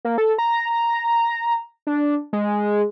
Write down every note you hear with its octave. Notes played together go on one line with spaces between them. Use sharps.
A#3
A4
A#5
D4
G#3